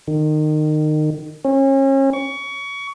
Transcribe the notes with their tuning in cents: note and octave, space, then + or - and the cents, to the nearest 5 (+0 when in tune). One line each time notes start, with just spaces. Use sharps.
D#3 -25
C#4 -35
C#6 +25